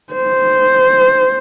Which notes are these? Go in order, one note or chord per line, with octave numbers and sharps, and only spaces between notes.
C5